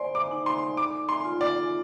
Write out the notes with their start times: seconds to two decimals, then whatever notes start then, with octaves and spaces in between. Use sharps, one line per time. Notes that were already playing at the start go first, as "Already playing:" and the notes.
Already playing: C5 D5 C6
0.15 D6
0.31 D#4
0.46 C6
0.77 A4 D6
1.09 C6
1.25 F4
1.41 D5